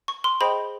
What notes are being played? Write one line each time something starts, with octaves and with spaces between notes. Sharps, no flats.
C#6
C6
G#4 C5 D#5 G5 B5